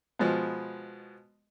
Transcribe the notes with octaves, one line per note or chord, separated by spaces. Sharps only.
B2 F3 G#3 B3